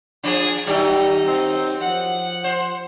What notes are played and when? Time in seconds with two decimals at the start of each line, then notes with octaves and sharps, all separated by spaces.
0.23 F3 D4 G#4
0.67 D#3 F#3 G3 D#4 G4
1.27 C4
1.81 F3 F#5
2.44 C5